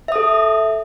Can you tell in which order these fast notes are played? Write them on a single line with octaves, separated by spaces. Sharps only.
E5 D#6 A4